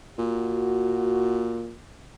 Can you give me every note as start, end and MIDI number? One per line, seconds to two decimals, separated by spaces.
0.18 1.73 46
0.18 1.66 66